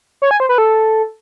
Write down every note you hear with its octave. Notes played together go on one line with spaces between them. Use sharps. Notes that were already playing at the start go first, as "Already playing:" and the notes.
C#5
G#5
C5
B4
A4